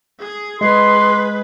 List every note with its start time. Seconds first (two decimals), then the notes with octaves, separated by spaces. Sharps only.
0.20 G#4
0.61 G#3 G#4 B4 C6